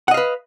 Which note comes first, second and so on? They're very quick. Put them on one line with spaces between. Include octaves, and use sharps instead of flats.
F#5 D#5 F5 B4